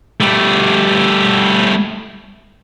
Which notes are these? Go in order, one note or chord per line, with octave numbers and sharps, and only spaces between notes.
G3 A3